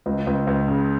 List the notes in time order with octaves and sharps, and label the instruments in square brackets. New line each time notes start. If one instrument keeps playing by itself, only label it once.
[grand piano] C#2
C#2
C#2
C#3